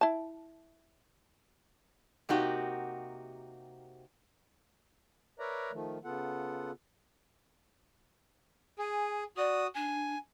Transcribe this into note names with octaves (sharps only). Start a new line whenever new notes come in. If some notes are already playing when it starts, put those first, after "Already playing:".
E4 A5
C3 A#3 D#4 F#4 G4
A#4 B4 C#5 D5 E5 A#5
D#3 F3 A3
C#3 B3 F4 A4 F#5
G#4 G#5
F#4 D5 D#6
D4 G#5